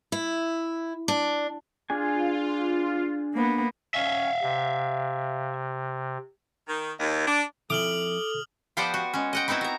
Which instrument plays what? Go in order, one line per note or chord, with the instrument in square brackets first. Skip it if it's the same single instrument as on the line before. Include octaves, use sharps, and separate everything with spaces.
[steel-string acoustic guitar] E4
D4
[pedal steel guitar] D4 G#4 G#5 [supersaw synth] F4
[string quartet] A#3 B3
[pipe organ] C#4 [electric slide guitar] E5 F5
[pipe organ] C3
[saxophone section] D#3
D#2
D4
[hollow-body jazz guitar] F2 E4 [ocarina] A4 [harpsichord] D6 [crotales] D#6 F6 F#7
[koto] F3 B3 G4 C5 D5 F#5
F#4
G#3 C#4
D#5 F#5 G5
B3 C4 D#4 E4 F#4
F#4 A#5